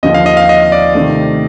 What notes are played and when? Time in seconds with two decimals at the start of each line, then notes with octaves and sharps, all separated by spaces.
0.03 D#2 D3 F3 C4 F4 D#5
0.14 F5
0.26 D#5
0.37 F5
0.49 D#5
0.72 D5
0.95 C3 D#3 A3